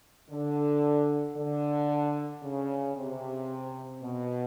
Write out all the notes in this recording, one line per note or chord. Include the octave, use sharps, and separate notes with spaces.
D3
D3
C#3
C3
B2